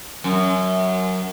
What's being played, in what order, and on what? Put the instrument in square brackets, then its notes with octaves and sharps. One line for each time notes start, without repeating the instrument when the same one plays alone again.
[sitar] F#2